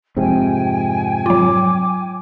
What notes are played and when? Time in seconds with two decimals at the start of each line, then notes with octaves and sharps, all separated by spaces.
0.17 F2 G#2 C3 G5 G#5
1.26 F#3 F4 D6